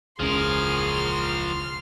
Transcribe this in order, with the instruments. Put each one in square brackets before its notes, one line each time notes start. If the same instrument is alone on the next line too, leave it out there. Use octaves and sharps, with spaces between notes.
[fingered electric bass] E1 C#2 C#4 [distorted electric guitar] F3 A#4 [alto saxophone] G#4 [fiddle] C6 F6